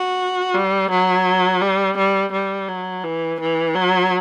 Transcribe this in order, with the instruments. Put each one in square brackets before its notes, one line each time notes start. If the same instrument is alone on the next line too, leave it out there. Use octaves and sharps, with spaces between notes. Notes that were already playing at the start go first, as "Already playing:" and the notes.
Already playing: [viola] F#4
G3
F#3
G3
G3
G3
F#3
E3
E3
F#3